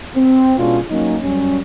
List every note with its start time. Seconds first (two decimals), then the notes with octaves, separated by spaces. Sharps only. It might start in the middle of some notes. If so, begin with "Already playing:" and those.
0.16 C4
0.59 B2 G#3 C#4 D4 F4
0.90 F#3 A#3 C#4 D#4
1.23 F#2 G3 C#4